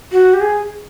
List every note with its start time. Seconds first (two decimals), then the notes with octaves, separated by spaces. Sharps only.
0.12 F#4
0.34 G4
0.41 G#4